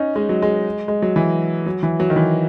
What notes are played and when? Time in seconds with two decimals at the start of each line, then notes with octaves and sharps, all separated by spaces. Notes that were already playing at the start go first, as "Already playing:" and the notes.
Already playing: C#4 D#4
0.16 G#3
0.29 F#3
0.42 G#3
0.88 G#3
1.02 F#3
1.16 E3
1.66 F#3
1.83 E3
2.00 F#3
2.10 D#3
2.16 E3